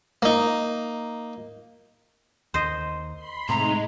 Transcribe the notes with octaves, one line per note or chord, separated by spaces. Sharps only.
A#3 D#4
D#2 C5 D#5
B5 C6
A2 C3 G#3 D#4 A#5